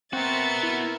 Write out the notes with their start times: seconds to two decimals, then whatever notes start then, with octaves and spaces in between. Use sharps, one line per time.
0.13 B3 C4 F#4 A#4 E5 A6 C#7
0.63 E4